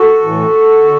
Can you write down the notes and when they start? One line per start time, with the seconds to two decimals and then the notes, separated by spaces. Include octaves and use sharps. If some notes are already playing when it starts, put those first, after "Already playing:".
Already playing: F#4 A4
0.22 A2 E3
0.83 D3